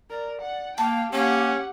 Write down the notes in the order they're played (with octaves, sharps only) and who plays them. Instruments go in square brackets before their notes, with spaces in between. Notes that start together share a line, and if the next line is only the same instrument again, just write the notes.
[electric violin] A#4 [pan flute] D5
[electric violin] F#5
[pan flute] A#3 [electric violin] F5 G5 [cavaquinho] A5
[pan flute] A#3 [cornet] C#4 [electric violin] G4 F#5